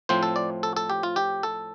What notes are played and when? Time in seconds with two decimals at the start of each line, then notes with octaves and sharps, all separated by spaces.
0.09 A2 F3 C4 C5
0.23 A4
0.36 D5
0.63 A4
0.77 A4
0.90 G4
1.03 F4
1.16 G4
1.43 A4